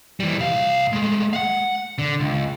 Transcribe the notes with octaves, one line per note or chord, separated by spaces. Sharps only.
E3 G3
C2 F5
G#3 A3
F5 F#5
D3
C#2